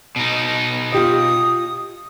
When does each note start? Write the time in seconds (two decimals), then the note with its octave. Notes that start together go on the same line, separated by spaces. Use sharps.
0.16 B2 D#4
0.93 F4 G4 D#5 D#6